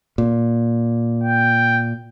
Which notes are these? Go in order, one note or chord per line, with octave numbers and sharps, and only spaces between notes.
A#2
G5